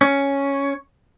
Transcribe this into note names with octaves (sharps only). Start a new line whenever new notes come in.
C#4